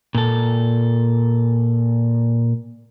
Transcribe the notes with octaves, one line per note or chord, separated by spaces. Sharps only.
A#2 A4